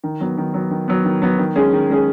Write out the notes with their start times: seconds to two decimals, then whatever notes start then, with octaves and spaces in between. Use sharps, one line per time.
0.03 D#3
0.20 F#3 B3
0.38 D#3
0.54 F#3 B3
0.71 D#3
0.88 F#3 B3
1.05 D#3
1.22 F#3 B3
1.39 D#3
1.56 G#3 C#4 G#4
1.73 D#3
1.90 G#3 C#4 G#4